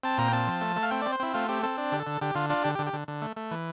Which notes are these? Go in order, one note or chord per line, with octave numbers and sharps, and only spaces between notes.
C4 A5
A#2 A#5
G5
C4 A5
F3
A3
A3
F5
C4 G5
C4 D5
C5
C4 E4
A3 F4
C4 G4
C4 A4
D4
D3 G4
A4
D3
D3 G4
D3 F4
D4 F4
D3 G4
G4
D3
G4
D3
D3
A3
A3
E3